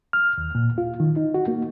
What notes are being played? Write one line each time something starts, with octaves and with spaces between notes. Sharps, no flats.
F6
D#2
A#2
F4
D#3
D#4
F#4
A#3